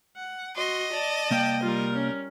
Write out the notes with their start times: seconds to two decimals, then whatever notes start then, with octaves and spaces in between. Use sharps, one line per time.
0.16 F#5
0.57 F#4 D#5 C6
0.92 D5 A5
1.31 C2 A#3 F5 G5
1.62 G3 F4 A#4
1.94 C#4